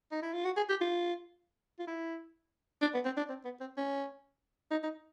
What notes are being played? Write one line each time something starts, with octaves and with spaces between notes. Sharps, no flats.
D#4
E4
F4
F#4
G#4
G4
F4
F4
E4
D4
B3
C4
D4
C4
B3
C4
C#4
D#4
D#4